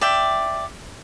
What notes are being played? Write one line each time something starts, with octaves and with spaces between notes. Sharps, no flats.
D5 E5 G5